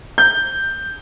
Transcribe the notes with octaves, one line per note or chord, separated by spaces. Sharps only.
G6